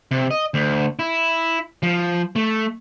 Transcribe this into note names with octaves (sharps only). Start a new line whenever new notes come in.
C3
D#5
D2
E4
F3
A3